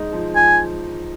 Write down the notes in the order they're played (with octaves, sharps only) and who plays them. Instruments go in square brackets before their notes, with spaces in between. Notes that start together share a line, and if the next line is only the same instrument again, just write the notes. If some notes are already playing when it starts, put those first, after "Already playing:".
Already playing: [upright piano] G#3 D#4
F3
[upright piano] F3 [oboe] G#5